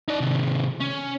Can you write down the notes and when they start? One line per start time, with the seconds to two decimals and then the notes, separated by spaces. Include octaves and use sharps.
0.08 D#4 D5
0.21 C3 D#3
0.81 C#4